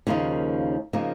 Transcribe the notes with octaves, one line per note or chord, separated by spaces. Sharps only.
D#2 C#3 F3 A#3 D#4
C#3 F3 A#3 D#4